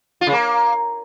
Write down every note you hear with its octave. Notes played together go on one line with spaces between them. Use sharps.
F4
C#3
A#3